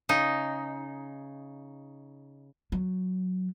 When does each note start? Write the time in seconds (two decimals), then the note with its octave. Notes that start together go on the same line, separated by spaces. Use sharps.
0.09 C#3 D#4
2.72 F#3